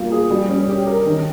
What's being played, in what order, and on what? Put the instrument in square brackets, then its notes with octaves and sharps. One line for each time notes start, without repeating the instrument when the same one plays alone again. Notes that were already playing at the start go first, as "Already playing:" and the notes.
Already playing: [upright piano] G3 A#3 F4
G#4
G3
C#4
G4
A#4
D#3